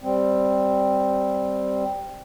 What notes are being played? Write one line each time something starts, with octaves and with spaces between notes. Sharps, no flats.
G3 C4